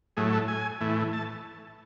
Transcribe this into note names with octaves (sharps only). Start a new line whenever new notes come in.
A2 F#3 A3 G#4
A4
G#5
A2 E3 A3
A5